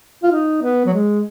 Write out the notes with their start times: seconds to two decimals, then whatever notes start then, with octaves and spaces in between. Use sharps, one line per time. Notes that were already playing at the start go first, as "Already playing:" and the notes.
0.23 F4
0.32 D#4
0.63 B3
0.86 F#3
0.93 G#3